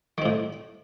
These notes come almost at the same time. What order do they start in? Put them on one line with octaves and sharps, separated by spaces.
D#3 C4 A2